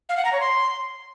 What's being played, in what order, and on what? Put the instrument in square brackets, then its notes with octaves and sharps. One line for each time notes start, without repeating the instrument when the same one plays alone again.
[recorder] F5
F#5
A#5
C#5
C6